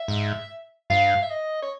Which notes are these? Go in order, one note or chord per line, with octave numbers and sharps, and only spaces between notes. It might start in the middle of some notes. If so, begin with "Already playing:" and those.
Already playing: E5
G#2
G2 F5
E5
D#5
C#5